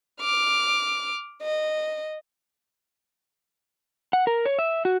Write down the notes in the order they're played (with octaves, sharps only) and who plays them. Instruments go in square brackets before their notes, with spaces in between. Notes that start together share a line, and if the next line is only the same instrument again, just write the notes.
[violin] D6 F6
D#5
[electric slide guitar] F#5
A#4
C#5
E5
F#4